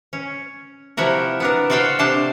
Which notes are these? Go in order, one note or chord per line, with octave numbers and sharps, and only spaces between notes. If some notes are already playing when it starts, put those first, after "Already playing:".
C#4
C3 F3 E4 F#4 A#4
B3 D4 A#4
F#4 A4 C5 F5 G5
C3 D4 C5 A5